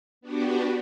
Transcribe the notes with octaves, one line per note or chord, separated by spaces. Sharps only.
B3 D4 F#4 G4